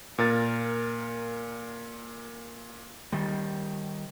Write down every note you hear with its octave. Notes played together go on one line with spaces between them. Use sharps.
A#2 A#4 A6
D#3 G3